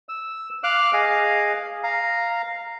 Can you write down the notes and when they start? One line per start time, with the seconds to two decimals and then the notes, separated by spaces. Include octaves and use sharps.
0.09 E6
0.64 F5 D6 F6 F#6
0.93 G#4 D#5 F5
1.83 F5 A#5